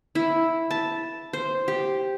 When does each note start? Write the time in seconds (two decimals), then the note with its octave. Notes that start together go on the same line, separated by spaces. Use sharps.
0.15 E4
0.71 A5
1.33 C5
1.68 G4